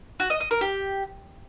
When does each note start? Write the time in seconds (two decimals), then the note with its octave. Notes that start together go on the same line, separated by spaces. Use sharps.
0.20 F#4
0.30 D#5
0.40 D#5
0.51 A#4
0.61 G4